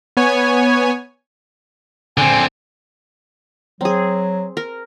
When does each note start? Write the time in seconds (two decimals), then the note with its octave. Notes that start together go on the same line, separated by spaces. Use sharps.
0.17 B3 C#5 G#5
2.18 D3 C4 G#5
3.81 F#3 C4 G#4
4.57 A#4